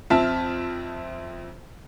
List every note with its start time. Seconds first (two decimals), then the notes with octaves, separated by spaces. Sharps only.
0.10 F2 C4 E5 A5 F6